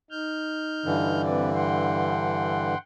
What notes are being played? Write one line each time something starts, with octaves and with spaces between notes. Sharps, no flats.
D#4 F6 G6
G2 D3 E3
C4 B4 D5
F#5 G5 C6